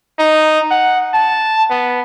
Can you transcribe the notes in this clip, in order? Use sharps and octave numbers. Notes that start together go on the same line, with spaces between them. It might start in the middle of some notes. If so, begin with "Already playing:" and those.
D#4
F#5
A5
B3